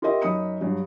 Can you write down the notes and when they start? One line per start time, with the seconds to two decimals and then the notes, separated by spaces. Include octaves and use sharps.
0.02 F4 G4 A#4 D#5 E5
0.22 F#2 D#4 B5 D#6 C#7
0.61 G2 F#3